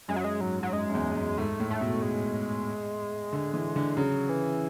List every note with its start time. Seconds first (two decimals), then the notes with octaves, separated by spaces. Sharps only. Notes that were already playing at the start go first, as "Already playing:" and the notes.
0.08 F#2 G#3
0.16 F#3
0.24 G#3
0.41 G#2 F#3
0.63 F#3
0.73 F#2 G#3
0.89 F#2
0.95 E2
1.12 E2
1.16 F#2
1.38 G#2 A3
1.60 A2
1.71 A3
1.81 B2
2.02 G#3
3.33 D3
3.53 E3
3.76 D3
3.97 C#3 F#3
4.29 E3